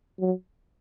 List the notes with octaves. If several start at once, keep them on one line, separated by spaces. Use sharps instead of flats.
F#3